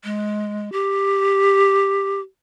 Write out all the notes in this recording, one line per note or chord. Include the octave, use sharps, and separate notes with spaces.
G#3
G4